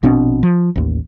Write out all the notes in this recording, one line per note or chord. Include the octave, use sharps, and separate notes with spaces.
A#1 B2 C4 D4
F3
A1 D#2